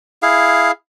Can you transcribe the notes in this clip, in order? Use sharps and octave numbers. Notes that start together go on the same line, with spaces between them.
E4 G#4 F5